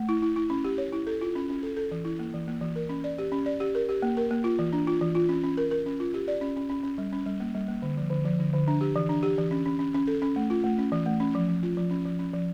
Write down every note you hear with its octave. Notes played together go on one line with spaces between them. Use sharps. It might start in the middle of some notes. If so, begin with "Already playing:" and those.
Already playing: A3
E4
E4
E4
C#4
G4
C#5
E4
A4
F4
C#4
C#4
A4
A4
E3
E4
A#3
E3
A#3
E3
A#4
C#4
D5
G4
C#4
D5
G4
A#4
G4
A#3
A#4
A#3
F4
E3
D4
F4
E3
F4
C#4
C#4
A#4
A#4
C#4
F4
G4
D5
C#4
C#4
C#4
C#4
G3
C#4
G3
A#3
G3
A#3
D3
F3
D3
F3
D3
D3
D4
G4
E3
D4
G4
E3
C#4
C#4
C#4
C#4
A4
C#4
A3
F4
A3
C#4
E3
A3
C#4
F3
F3
F4
F3
C#4
F3
C#4
F3